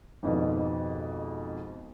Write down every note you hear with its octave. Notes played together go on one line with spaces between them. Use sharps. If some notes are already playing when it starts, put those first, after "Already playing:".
G#1 F2 G#2 B2